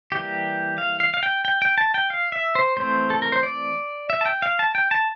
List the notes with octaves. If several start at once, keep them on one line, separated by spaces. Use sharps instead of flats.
E3 G3 A#3 G4
F5
F5
F5
G5
G5
G5
A5
G5
F5
E5
C5
E3 A3 C4 C5
A4
A#4
C5
D5
E5
A5
G5
F5
A5
G5
A5